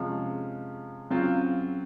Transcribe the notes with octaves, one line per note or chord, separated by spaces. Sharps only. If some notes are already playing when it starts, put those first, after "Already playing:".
Already playing: C3 F3 G#3 C#4
C#3 F#3 C4 F4